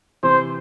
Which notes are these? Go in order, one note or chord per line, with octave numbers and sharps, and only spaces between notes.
C3 E3 C5